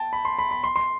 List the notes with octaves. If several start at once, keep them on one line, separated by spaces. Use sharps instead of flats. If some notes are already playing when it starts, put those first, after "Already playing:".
Already playing: G5 A5
B5
C6
B5
B5
C6
C6